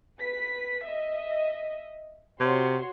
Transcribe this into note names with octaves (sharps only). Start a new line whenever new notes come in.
B4 B6
D#5 E5
C3 F#4 C#5 C6